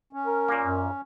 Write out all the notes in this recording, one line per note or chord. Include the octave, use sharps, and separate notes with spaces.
C#4
A#4
A#2 A#3
F#2